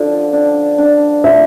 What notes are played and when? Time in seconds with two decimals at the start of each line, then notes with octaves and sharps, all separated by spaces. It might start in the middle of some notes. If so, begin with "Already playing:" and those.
Already playing: D3 F3
0.33 D4
0.78 D4
1.24 F3 E5